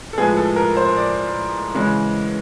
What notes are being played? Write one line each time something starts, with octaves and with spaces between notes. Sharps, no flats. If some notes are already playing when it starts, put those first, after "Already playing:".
A4
A2 F3 G#3 B3 G#4
A4
A#4
C5
D5
C#3 E3 G#3